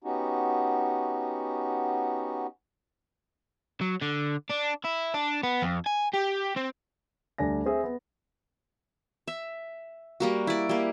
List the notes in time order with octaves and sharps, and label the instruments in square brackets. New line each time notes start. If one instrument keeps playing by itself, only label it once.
[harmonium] B3 C#4 D#4 F#4 G4
[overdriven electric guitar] F#3
D3
D4
E4
D4
B3
F2
G#5
G4
C4
[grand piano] D2 G3 D4 G#5 A#6
C4 G#4 E5
B3
[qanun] E5
G3 A#3 F#4
E4 D5
G3 A#3